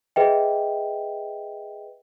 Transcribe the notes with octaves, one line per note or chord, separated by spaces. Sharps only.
G#4 B4 D#5 E5 G5